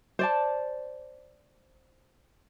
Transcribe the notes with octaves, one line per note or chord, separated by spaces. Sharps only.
C5 D5 A5